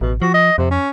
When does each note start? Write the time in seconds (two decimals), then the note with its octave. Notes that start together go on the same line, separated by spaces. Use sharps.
0.01 A1 B2
0.22 F3 F#4
0.34 D#5
0.58 F2 C3
0.71 C#4